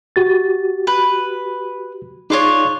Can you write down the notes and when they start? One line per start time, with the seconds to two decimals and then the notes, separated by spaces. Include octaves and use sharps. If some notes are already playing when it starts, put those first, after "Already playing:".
0.16 F#4 G4 A6
0.87 B4
2.30 D4 D#4 F4 G#4 C#5